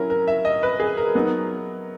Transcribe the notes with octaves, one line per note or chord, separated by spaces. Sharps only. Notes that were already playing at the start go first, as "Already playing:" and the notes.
Already playing: F#3 C#4 E4 A#4
A#4
E5
D#5
B4
G#4
A#4
F#3 B3 D#4